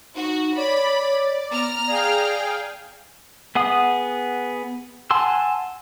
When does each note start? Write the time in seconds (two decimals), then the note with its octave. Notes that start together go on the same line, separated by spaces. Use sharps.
0.16 D#4 F#4
0.56 C#5 D5 B5
1.51 B3 A#5 F6
1.87 G#4 D5 F5 G5
3.55 B3 G#4 F#5 D#6
5.11 F#5 G#5 A5 C6 E6